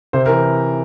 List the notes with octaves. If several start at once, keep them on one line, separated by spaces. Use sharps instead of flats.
C3 C5
E3 A#4